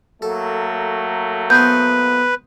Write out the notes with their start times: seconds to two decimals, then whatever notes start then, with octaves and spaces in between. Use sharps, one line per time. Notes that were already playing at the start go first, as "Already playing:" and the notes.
0.22 F#3 A3 A#3 A4
1.50 B3 D#4 B4 C5 G6